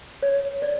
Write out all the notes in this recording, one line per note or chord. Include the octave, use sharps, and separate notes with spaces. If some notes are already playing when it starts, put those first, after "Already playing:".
C#5
D5